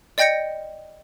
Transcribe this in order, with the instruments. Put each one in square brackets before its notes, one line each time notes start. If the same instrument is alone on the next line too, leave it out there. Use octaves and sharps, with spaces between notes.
[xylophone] D5 D#5 G5 G6 A#6 C#7